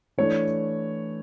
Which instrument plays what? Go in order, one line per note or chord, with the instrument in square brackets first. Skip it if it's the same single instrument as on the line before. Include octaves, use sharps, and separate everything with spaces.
[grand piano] E3 A3 D4 C#5